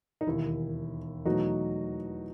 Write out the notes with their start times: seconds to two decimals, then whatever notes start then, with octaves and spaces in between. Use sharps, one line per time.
0.21 D#4
0.27 E1 D#2 D#3 E4
1.25 E2 B2 F#3 A3 D#4 F#4